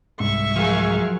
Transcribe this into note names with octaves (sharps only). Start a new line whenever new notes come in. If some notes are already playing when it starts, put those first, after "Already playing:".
C2 G#2 E5 C#6
F3 F#3 G#4 A#4 F5